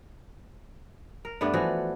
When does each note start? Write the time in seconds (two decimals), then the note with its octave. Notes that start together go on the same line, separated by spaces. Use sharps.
1.25 A#4
1.41 G2 A3 B3 D4
1.54 E3 F3 F#4